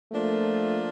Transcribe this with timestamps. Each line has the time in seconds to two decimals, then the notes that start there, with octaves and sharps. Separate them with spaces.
0.12 F3 A3 A#3 D4 F4